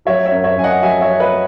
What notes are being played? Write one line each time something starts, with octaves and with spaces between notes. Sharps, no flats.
F#3 C#5 E5
C#5 E5
F#2
C#5 E5
F#2 G#5
D#5 F#5
F#3 E5 G#5
C#5 E5
F#3
B4 D#5